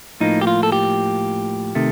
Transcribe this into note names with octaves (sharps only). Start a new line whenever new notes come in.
A2 F3 A#3 D#4
G4
F4
A4
G4
C3 D#3 A3